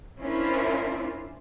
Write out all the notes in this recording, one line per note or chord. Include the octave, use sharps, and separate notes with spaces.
C#4 D4 E4 F4 A#4 C5